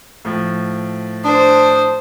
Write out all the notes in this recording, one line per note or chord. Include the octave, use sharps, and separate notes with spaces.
A2 F3
D4 C5 D#6